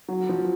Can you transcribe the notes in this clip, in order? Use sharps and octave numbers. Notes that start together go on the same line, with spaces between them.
F#3
F3